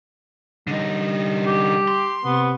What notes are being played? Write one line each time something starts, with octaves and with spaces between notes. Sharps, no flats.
D3 G3 D#4
G4
C6
C3 B3